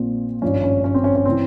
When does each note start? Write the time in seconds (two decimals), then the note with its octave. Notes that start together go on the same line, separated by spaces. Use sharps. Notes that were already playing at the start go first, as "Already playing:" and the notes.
Already playing: A#1 A#2 F3 C4
0.42 G#1 G2 F3 C#4
0.64 C#4
0.84 C#4
0.94 C4
1.04 C#4
1.16 C#4
1.25 E3 C4